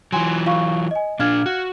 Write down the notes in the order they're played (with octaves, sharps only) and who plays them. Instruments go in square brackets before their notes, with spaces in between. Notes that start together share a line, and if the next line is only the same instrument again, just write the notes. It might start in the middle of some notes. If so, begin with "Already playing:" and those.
[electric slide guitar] E3 F#3 [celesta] G5 G#5 C6
[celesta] F4 F5 C#6
D#5 G#5
[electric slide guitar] A#2 D4 [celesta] F5 F6 G#6
[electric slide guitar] F#4